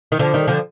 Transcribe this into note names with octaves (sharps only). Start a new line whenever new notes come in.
D#3
D3 F3
D#3 G3
D3 F3